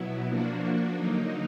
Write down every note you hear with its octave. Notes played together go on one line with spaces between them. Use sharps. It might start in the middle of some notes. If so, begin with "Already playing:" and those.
Already playing: B2 F#3 B3 E4
F3 A#3 D4 F#4
D3 F#3 A#3 D#4